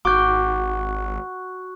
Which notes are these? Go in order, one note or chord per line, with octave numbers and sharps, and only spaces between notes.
G#1 F#4 C#6 D6 F#6 G6